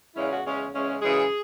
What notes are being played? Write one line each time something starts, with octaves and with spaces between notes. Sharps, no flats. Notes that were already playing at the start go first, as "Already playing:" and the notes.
E2 C#3 G#3 C#4 E4
F#4
E2 C#3 G#3 C#4
E2 C#3 G#3 C#4
F#2 C#3 E3 G#3 G#4